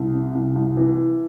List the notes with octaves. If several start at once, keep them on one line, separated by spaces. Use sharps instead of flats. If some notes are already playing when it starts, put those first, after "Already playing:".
Already playing: C2
C3
C2
C2
E3